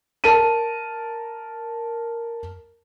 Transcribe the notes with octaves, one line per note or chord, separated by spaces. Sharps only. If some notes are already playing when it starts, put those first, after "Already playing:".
A#4 A5 D#7